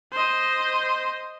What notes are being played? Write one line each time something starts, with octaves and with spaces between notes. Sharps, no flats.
C5 D#5